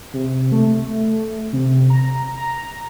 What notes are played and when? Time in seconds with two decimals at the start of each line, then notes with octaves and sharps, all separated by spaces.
0.13 C3
0.52 A3
1.53 C3
1.90 A#5
2.37 A#5